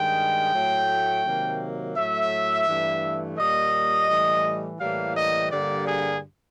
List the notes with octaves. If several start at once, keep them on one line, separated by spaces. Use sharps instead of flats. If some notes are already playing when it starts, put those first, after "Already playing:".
Already playing: G2 D#3 G#3 G5
A2 F#3 A3
C3 D#3 F#3 A#3
A2 F#3 A3 E5
G2 E3 A3
A#2 G3 A#3 D#5
A2 E3 G3
A2 E3 G3 A#3 F5
D#5
G2 D3 G3 A#3 D5
G#4